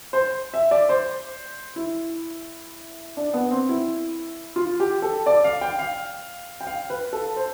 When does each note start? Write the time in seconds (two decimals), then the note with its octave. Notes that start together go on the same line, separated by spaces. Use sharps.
0.13 C5
0.54 E5
0.71 D5
0.89 C5
1.76 E4
3.17 D4
3.34 B3
3.51 C4
3.69 E4
4.56 F4
4.80 G4
5.02 A4
5.26 D5
5.44 F5
5.61 G5
5.79 F5
6.61 G5
6.67 F5
6.90 B4
7.13 A4
7.36 C5